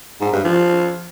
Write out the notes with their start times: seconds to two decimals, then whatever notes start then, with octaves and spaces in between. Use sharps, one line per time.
0.21 G#2
0.32 G2
0.44 F3